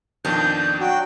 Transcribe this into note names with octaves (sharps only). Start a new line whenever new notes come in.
F2 B2 D#3 D4 G6
F#3 F#4 G5